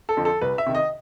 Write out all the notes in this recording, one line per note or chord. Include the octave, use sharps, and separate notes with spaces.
A4
F2 D3 F3
A4
C2 B4
E5
C3 D#3
D#5